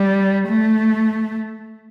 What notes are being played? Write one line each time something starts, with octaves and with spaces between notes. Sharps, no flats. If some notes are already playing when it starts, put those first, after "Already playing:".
Already playing: G3
A3